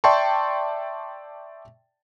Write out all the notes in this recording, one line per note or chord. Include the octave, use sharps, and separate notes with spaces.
D5 E5 G5 A5 C6 C#6